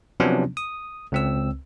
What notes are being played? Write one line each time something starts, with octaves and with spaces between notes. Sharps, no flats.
C3 F3 F#3 B3 C#4 D4
D#6
C#2 C4 E6